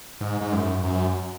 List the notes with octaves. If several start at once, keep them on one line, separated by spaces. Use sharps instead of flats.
G#2
G#2
F#2
F#2